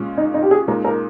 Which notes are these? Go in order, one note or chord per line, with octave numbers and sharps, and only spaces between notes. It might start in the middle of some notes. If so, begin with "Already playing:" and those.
Already playing: A#2 G#3 C#4 F4
D#4
D#4
G4
G#4
A#2 G#3 D#4 A#4
A#4